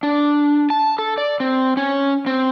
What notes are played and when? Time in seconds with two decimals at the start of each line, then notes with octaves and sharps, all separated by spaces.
0.03 D4
0.70 A5
0.99 A4
1.18 D5
1.40 C4
1.77 C#4
2.26 C4